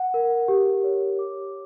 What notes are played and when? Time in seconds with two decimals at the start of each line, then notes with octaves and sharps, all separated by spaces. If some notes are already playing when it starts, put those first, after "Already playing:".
Already playing: F#5
0.14 A#4
0.48 G4
0.84 C#5
1.19 D6